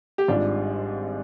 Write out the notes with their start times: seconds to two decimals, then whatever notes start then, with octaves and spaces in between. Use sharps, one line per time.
0.18 G4
0.28 G#1 G#2 G3 D4 F4